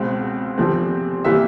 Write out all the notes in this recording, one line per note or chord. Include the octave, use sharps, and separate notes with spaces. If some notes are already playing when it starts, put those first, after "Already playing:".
Already playing: C#2 B2 G#3 C4
E2 C3 F3 A3 C4
C3 E3 G3 A#3 E5